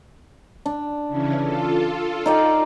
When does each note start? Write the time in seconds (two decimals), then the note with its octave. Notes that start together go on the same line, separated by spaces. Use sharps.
0.66 D4
1.08 C#3 E3 C#4
1.42 F4 A4
2.26 D#4 D5 G5